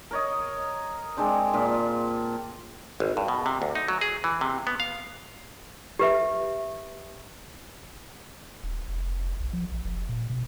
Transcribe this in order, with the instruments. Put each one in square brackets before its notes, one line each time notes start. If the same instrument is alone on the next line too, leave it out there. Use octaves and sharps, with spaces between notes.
[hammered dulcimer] A#4 C#5 D#5
G#3 C4 D4 C5
A#2 D4 F4
[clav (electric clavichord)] G#1
G2
B2
C3
D2
D#4
F#3
G#4
E3
C3
B3
F5
[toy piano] G4 B4 E5
[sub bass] D#1
F1
B1
F3
A#1
F1
A#2
B2